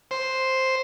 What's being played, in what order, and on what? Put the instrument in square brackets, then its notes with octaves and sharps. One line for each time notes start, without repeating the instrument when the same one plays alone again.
[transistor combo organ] C5